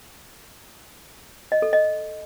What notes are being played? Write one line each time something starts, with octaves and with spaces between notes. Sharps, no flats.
D#5
A4
D#5